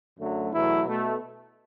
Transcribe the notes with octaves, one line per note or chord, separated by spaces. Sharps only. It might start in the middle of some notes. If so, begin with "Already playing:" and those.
F#2 D3 F#3 A3
E2 B2 F#3 A3 E4
B2 A3